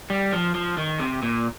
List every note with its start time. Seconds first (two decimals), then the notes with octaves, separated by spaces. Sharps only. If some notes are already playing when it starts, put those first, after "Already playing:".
0.10 G3
0.32 F3
0.55 F3
0.77 D#3
0.99 C3
1.23 A#2